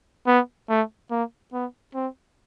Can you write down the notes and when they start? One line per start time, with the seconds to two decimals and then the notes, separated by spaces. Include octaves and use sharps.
0.27 B3
0.69 A3
1.11 A#3
1.53 B3
1.95 C4